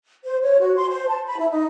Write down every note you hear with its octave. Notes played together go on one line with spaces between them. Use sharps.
C5
C#5
F#4
C6
C5
A5
B5
E4
D#4